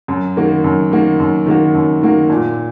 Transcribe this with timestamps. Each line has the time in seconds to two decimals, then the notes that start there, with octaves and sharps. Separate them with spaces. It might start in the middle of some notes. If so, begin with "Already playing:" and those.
0.08 F#2
0.37 D#3 A#3 F#4
0.64 F#2
0.92 D#3 A#3 F#4
1.20 F#2
1.46 D#3 A#3 F#4
1.75 F#2
2.02 D#3 A#3 F#4
2.30 A#2